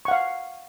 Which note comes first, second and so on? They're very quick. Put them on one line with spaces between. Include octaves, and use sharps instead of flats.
C#6 F#5 F5